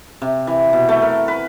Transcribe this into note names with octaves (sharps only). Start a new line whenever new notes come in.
C3
E3
B2
A3
A#4
B4